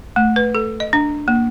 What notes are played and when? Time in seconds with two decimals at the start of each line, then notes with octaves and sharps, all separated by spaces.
0.16 A3
0.36 B4
0.55 A4
0.80 D#5
0.93 D4
1.28 A#3